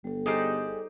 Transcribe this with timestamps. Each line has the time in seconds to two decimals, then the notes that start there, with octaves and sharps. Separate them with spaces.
0.04 G1 G3 A4
0.26 D#4 G4 G#4 C5 D5 F#6